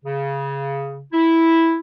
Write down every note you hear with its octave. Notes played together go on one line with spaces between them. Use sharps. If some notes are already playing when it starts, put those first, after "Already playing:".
C#3
E4